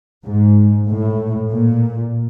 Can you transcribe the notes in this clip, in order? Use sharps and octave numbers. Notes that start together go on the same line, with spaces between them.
G#2
A2
A#2